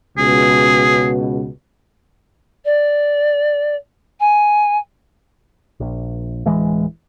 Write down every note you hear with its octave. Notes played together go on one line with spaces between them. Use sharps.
C#2 B2 G#4
D5
G#5
A#1
D1 E3 G#3